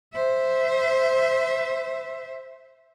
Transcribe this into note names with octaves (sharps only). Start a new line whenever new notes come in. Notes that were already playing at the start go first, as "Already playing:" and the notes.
C5 E5